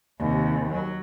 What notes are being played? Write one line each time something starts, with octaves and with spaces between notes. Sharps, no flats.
D#2 C3
F#3